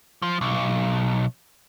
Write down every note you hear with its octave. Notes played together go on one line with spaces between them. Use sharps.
F3
B1